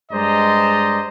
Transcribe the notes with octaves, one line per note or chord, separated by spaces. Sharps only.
G2 G#3 C5 D5 D#5 A#5